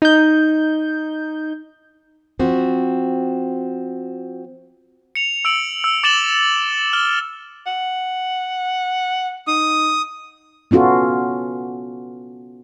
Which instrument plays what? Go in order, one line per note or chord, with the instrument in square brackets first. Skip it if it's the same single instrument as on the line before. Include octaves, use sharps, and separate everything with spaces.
[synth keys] D#4 G6
[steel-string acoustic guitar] F3 C4 F#4
[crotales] C#7 F7
E6 D7 F#7
E6
D6 A6 D7 E7 F#7 G7
F6 G7
[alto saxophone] F#5
[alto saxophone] D#4 [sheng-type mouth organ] D#6
[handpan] B3 C#4 F4 F#4 A4